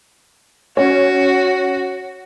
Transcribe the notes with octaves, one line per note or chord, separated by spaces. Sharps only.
C#4 F#4